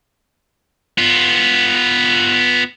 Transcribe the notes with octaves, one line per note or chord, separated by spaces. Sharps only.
B3 F4